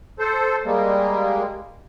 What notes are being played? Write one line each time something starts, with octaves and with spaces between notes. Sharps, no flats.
A4 C5
G3 G#3 A#3